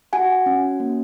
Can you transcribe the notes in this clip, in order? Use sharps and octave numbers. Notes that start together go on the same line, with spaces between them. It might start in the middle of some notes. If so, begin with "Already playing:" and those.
F#4 F#5 G#5
C#4
A#3